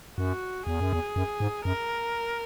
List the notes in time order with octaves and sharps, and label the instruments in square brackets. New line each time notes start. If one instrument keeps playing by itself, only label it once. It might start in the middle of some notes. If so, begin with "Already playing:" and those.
[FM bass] F#2 [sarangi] F#4
[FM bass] E2 [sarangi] G#4
[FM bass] F#2
E2
F#2
G#2
[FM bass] F#2 [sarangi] A#4